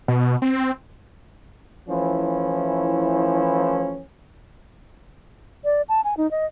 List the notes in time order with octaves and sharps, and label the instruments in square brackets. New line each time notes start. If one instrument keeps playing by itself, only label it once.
[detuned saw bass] B2
C4
[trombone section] E3 F3 A3 C#4 E4
[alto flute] D5
A5
G#5
D#4
D#5